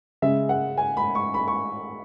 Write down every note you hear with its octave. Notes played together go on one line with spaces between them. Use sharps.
C#3 G#3 E5
F#5
G#5
B5
C#6
B5
C#6